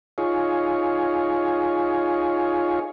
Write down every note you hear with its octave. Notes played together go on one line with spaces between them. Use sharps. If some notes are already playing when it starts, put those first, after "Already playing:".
D#4 F4 G#4 C#5